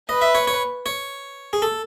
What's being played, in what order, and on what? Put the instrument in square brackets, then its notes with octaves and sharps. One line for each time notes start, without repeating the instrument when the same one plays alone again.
[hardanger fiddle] B4 [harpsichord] D#5
[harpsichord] E5
C#5
C#5
C#5
G#4
A4